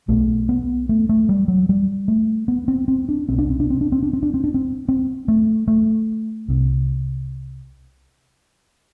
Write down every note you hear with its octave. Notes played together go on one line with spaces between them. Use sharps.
B1 B2 A3
B3
A3
A3
G3
F#3
G3
A3
B3
C4
C4
D4
C2 B2 C4
D4
C4
D4
C4
D4
C4
D4
C4
D4
C4
D4
C4
C4
A3
A3
C2 C3